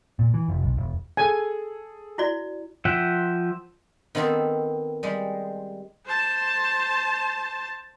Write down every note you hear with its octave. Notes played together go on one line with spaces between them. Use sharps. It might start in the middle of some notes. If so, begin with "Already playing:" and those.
A#2
E3
F1
B1
E1
G#4 A4 G#5
E4 F#4 D5
F3 E5 F#5 G5
D#3 B3 C4 D#4 A4 C5
G3 G#3
C5 A5